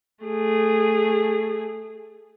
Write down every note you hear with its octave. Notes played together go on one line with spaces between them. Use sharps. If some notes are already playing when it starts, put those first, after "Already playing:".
A3 G#4